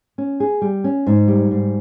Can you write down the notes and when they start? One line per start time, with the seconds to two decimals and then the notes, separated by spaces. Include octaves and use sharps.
0.18 C#4
0.40 G#4
0.62 G3
0.84 C#4
1.07 G#2
1.28 G3
1.51 G#2